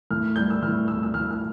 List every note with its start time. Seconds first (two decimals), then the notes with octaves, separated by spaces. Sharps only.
0.11 A2 F6
0.36 G3 G6
0.50 E6
0.62 A2 F6
0.88 A2 E6
1.03 E6
1.14 A2 F6
1.31 F6